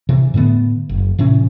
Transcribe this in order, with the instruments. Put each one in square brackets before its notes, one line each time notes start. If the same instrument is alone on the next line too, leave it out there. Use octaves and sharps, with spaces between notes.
[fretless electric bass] C3 E3
A2 D3 A3 B3
F#1
A2 C3 E3 C#4